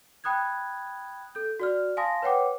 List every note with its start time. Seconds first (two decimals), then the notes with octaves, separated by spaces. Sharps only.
0.24 G5 B5 D#6 F#6 G#6
1.35 A4 G6
1.60 F#4 D5 F6
1.97 F5 G#5 A5 C6 D#6 A#6
2.22 B4 C#5 F#5 G5 D6